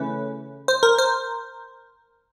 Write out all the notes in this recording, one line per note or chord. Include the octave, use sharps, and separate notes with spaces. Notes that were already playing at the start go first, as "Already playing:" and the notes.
Already playing: C#3 E3 A3 C#4 B4
C5
A#4
C5